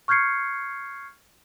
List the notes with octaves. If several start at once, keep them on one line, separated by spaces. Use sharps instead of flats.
C#6 F6 G6 G#6 C7 C#7